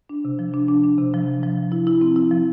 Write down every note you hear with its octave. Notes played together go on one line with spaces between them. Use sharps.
D4
C3
F3
D4
D4
D4
C3
F3
F3
F3
F3
E4
E4
C4
E4
F3